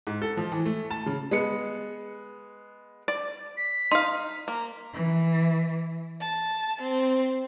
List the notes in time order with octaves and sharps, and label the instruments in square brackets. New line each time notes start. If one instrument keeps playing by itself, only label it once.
[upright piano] G#2
A4
F3
E3
A3
A5
C#3
[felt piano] G#3 B3 C#7
[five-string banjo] D5
[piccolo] B6
[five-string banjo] D#4 F5 [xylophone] C6
[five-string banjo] A#3 [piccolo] A#5
[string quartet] E3
A5
C4